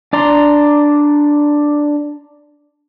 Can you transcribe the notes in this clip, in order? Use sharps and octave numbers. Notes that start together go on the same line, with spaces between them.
D4 D5 A#5 C6